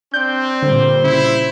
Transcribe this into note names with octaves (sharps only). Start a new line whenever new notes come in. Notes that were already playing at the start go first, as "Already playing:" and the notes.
C4 D4 G6
A#2 D3 G3 C5
C#3 E4